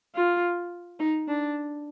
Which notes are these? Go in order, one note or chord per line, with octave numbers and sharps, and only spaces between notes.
F4
D#4
D4